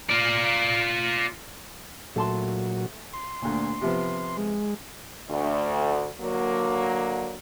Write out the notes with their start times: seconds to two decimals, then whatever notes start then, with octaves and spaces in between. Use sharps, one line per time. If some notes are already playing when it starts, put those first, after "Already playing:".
0.09 F4 D5
2.16 A#2 F#3 A3 A5 C6
3.13 C6
3.42 D2 A#2
3.81 C3 F3 B3
4.37 G#3
5.30 D2
6.21 D3 F#3 A#3